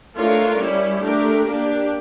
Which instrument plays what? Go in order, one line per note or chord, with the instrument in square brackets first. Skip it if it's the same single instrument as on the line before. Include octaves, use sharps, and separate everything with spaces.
[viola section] A3 D4 F4 A#4 C#5
G3 C#4 E4
A3 D4 G4 A#4
A#3 D4 G4